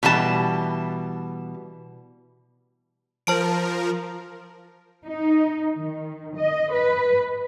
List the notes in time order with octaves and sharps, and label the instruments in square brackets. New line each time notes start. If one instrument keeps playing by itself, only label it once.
[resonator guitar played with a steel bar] B2 E3 G3 A5
[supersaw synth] F3 A#4 [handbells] C5 A5 D7
[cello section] D#4
D#3
D#5
B4